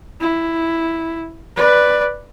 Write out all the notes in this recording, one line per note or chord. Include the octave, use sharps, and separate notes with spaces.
E4
B4 D5